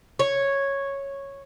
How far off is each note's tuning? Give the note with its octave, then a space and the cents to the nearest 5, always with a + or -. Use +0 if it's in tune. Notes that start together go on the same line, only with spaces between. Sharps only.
C#5 -5